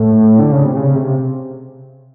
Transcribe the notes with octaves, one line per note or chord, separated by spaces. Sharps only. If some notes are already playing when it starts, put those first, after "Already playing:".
Already playing: A2
D3
C#3
C3
C#3
C3